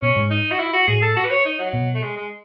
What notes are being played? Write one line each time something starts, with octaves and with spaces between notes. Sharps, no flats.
B2 C#4
G#2
D#4
F#4
E4
F#4
A2 G#4
A4
F#4
B4
C#5
D#4
F#3
B2
A3
G#3
G#3